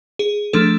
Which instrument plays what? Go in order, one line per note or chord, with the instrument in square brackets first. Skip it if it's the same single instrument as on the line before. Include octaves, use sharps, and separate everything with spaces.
[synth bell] G#4
F3 A3 D4 A4